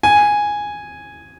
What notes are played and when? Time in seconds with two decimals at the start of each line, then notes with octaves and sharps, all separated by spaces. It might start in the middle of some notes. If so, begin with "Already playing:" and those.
0.03 G#5